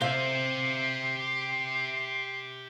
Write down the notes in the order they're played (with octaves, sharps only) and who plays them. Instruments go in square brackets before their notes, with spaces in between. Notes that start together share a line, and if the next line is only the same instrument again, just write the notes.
[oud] C3 F5 [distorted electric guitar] G4 E5 [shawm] C6